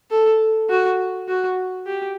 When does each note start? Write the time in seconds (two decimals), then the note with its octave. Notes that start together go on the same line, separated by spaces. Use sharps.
0.11 A4
0.70 F#4
1.28 F#4
1.87 G4